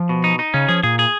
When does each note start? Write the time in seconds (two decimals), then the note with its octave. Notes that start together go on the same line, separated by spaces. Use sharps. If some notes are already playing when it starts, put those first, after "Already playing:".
Already playing: F3
0.09 B2
0.24 D#4
0.39 D#4
0.54 C#3 C#4
0.69 F3 G#4
0.83 A#2 G#4
0.99 G#4